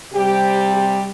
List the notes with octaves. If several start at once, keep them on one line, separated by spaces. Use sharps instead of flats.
C3 G3 C4 G4
G4